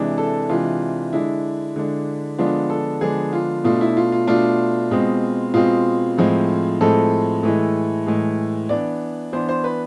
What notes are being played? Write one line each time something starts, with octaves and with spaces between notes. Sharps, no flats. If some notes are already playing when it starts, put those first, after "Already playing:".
Already playing: C3 E3 G#3 D4
A4
C3 E3 G#3 D4 F4
D3 G#3 D4 E4
D3 G#3 D4
D3 F3 G#3 B3 D4 F4
A4
D3 F3 G#3 B3 D4 G#4
F4
B2 A3 D4 F4
E4
F4
F4
B2 A3 D4 F4
B2 G#3 C4
B2 G#3 C4 F4
A2 F3 G#3 C4
A2 F3 G#3 C4 A4
A2 E3 G#3
A2 E3 G#3
E3 B3 D4 D5
E3 B3 D4 C5
C5
B4